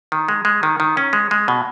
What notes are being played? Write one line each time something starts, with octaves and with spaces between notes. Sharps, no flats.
D#3
G#3
G#3
D#3
D#3
C#4
G#3
G#3
B2